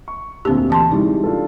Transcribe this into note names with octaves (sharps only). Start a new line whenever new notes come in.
C#6
D2 A#2 C4 D4 G4
E3 A5 C6
C3 G3 G#3 D#4 E4
D4 F4 A4